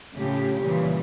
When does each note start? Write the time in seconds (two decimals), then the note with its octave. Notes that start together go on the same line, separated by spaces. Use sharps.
0.14 A2 C#3 F3 C#4 G4
0.62 A#2 C#3 E3 G3